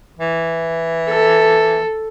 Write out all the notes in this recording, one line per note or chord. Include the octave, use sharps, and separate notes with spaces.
E3
A4